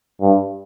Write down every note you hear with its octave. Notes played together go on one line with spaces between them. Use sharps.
G2